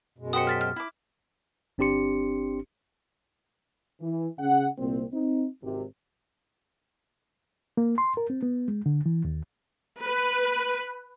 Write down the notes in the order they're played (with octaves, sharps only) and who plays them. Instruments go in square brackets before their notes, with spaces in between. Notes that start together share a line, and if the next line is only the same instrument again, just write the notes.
[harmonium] F#2 B2 G#3
[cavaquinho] F#4 G4 C5 [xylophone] D#6 C#7
[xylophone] F6 A6 B6
F6
[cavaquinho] E4 D6
[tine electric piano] G1 C4 D4 G4 C6 C#7
[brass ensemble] E3
C#3 F#5
C2 A#2 A#3 C4
C4 D#4
G#1 C3
[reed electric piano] A#3
C6
A#4
C4
B3
G#3
D3
E3
D#2
[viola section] B4